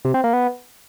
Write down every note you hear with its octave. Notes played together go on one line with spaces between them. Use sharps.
C3
C4
A#3
B3